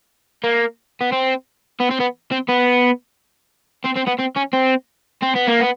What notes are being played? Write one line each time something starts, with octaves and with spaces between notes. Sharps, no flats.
A#3
B3
C4
B3
C4
B3
C4
B3
C4
C4
B3
C4
C#4
C4
C4
B3
A#3
B3